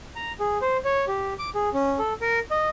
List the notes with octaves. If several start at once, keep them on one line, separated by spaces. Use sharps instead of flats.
A#5
G#4
C5
C#5
G4
D6
G#4
C#4
A4
A#4
D#5